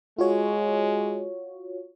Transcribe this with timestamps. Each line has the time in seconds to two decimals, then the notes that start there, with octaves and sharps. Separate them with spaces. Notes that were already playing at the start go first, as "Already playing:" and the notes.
0.18 G#3 F4 F#4 C#5